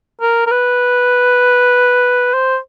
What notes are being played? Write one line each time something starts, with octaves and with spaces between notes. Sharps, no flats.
A#4
A#4
B4
C5